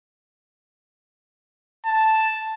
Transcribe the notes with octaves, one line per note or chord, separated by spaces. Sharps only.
A5